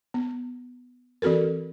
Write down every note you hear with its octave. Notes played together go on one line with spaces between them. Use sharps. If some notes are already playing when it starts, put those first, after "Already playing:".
B3
E3 C4 F#4 A4 A#4